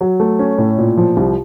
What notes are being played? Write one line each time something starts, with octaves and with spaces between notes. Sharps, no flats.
F#3
A3
C#4
A2
A#2
F3
C2